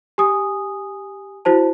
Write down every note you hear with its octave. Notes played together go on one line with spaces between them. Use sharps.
G4 G#5 D#6
E4 F#4 C5 A5